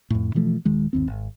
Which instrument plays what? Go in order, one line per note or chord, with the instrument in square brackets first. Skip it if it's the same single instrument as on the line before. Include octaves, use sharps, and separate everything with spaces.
[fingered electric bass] F2 A2
B2 E3 F3 A3
D#1 D#3 G#3
G1 D#2 C4
G#1